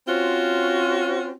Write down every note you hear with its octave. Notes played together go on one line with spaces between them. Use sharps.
C4 C#4 F4 F#4 C5